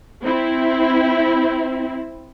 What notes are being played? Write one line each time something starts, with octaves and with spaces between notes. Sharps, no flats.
C4 E4